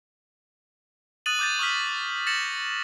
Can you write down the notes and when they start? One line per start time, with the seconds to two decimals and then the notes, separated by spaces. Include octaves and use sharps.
1.26 D#6 F#6 A6 D#7 F#7
1.39 D6 G6 A6
1.59 C#6 D#6 F6 B6
2.27 A6 A#6 C#7 E7 F#7